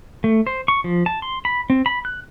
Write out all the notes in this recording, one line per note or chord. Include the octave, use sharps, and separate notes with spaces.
A3
C5
C#6
F3
A5
C6
B5
C4
B5
F#6